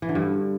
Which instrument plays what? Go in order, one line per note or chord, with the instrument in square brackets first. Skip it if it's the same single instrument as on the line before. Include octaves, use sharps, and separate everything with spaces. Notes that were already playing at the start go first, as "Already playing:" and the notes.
[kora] E3
D3
G2